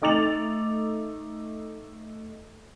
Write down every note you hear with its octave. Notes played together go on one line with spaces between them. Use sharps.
A3 D#4 D6 A6 F7 F#7